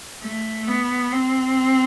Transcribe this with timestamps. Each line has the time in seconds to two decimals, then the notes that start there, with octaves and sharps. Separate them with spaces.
0.22 A3
0.68 B3
1.12 C4